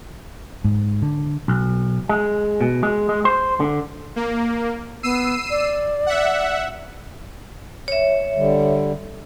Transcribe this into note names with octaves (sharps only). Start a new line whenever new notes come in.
G#2
D3
B1
G#3
B2
G#3
G#3
C5
D3
A#3
B3 E6 C7 D#7
D5
E5 F#5
C#5 E5
D3 G3